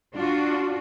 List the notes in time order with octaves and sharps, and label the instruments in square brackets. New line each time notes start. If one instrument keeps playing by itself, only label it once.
[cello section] D4 F4 F#4